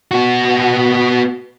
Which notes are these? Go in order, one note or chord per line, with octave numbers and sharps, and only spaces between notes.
B3 F#4